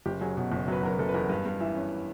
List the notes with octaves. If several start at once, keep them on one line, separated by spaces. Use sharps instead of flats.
F#1 G4
F#3 G#4
B2
F#1
F#3 B4
F#3 A#4
F#1 A4
B4
E2 A#4
G2 B4
G2
E3 E5
C#4